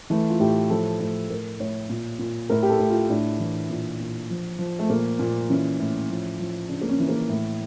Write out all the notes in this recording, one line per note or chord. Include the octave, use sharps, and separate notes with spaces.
E3 A3
F4
A2 G4
F3 A4
A2
A2 A#4
A2 C#5
A#2
A#2
A2 A#4
G4
A4
A2
F4
A2 D4
E3
A#2
A#2
F3
F3
A3
A#2 A#3
A#2
E3 C#4
A2
F3
F3
C#3 D4
A#3
C#4
E3 C#4
A#3
A2